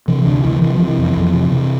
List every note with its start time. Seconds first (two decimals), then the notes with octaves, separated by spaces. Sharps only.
0.08 C3 E3
0.25 D2 D3
0.44 D2 E3
0.62 C3 E3
0.74 F3
0.80 C3
0.87 E3
0.98 F2
1.17 F2
1.34 C3
1.52 C3